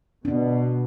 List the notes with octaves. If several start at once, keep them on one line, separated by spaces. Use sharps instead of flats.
B2 D4